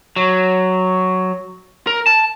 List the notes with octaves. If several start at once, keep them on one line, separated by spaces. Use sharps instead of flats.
F#3
A#4
A5